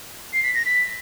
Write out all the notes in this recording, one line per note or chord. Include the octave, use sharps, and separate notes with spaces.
C7
B6
A#6
B6